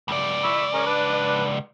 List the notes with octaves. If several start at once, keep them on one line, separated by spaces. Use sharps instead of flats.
C#2 D5
B5 C#6 E6
C#4 G#4 A#4
D4 B4